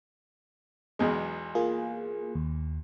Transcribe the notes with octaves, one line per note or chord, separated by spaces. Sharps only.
B1 E2 G#3
A#3 F4 G#4
D#2